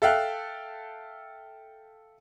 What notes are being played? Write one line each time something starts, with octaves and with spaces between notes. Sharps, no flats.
A4 E5 F5 G5 F#6